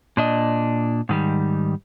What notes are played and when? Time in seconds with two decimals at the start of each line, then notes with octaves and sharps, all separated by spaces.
0.17 A#2 D4 D#5
1.09 G#2 D#3 G3